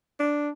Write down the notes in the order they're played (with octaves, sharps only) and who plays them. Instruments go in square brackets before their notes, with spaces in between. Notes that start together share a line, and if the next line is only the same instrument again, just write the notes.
[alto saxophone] D4